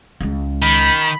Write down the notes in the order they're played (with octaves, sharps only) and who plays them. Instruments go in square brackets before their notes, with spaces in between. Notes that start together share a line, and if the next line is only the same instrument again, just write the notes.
[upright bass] C#2 G#3
[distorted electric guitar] D#3 [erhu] B5